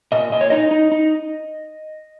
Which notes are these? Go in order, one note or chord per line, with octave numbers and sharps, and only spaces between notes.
A#2 D#5
A#2 D#5
C#5
D#4 D#5
D#4
D#4